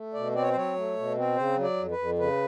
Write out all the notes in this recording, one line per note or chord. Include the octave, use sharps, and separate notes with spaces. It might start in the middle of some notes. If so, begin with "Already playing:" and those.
Already playing: A3
B2 D5
C4 D5
C#5
C5
F#3 C#5
A3
B2
C4
C#3 C5
F#3
D5
F2
B4
F2
C#3 B4